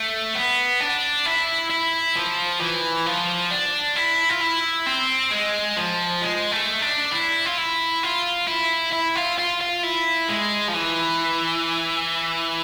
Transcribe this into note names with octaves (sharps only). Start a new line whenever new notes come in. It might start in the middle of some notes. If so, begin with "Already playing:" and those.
Already playing: A3
B3
D4
E4
E4
F3
E3
F3
D4
E4
F4
E4
C4
G#3
F3
G#3
A3
D4
E4
F4
E4
F4
E4
E4
F4
F4
F4
E4
G#3
F3
E3